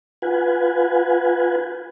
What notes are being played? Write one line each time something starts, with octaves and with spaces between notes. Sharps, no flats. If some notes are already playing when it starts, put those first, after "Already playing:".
F4 B4 F#5 G#5